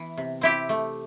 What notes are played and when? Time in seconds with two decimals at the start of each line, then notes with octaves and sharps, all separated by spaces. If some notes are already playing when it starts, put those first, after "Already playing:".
Already playing: E3 B3
0.17 C3
0.41 C4 E4 G4
0.69 A3